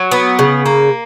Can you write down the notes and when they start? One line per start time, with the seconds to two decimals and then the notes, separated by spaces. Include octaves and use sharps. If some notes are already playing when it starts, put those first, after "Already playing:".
Already playing: F#3
0.11 B3
0.39 C#3
0.66 A#3